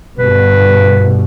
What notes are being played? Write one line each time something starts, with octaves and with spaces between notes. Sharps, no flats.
G1 G2 B2 B4